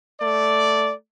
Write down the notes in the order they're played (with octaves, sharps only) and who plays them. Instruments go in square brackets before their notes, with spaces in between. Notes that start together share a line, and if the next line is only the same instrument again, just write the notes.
[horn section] A3 D5